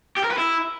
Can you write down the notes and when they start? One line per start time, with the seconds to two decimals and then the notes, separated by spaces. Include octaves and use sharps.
0.17 G4
0.24 A#4
0.30 B4
0.37 E4